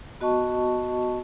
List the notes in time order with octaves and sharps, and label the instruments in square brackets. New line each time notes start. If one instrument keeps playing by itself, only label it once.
[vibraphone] B3 F#4 D#5 A5 C#6